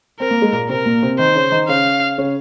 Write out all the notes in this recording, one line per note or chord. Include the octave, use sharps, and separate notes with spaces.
C4 A#4
A#3
G#3
A#2 A#3
C3 C4 A#4
A#2 A#3
C3 C4
D#3 D#4 C5
C#3 C#4
D#3 D#4
C#3 C#4 F5
C#3 C#4